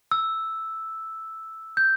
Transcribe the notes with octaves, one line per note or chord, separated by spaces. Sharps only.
E6
G6